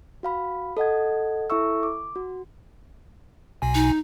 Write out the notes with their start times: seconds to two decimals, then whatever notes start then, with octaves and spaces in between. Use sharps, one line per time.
0.23 F#4 F5 B5
0.77 A4 D#5 F#5 G#6
1.50 E4 A4 E5 C#6 E6
1.83 D6
2.16 F#4
3.62 B1 B2 G#5
3.74 D#4